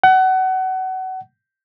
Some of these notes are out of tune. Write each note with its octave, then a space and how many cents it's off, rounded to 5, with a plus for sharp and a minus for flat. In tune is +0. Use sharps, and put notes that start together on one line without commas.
F#5 +25